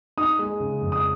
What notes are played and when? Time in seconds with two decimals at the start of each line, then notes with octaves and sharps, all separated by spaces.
0.17 D#4 D#6
0.39 G#3
0.60 C#3
0.82 F2
0.92 D#6